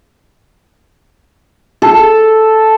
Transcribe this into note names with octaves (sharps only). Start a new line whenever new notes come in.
A4